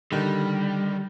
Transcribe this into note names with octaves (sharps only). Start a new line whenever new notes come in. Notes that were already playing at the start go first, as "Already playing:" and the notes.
D3 D#3 G3